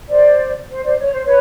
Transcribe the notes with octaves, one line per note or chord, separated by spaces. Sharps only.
C5 D5
C5
C5 D5
C#5
C5
B4 C#5